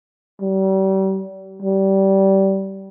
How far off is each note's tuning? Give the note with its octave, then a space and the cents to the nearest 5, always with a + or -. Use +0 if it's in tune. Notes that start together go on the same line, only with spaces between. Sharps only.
G3 -35
G3 -20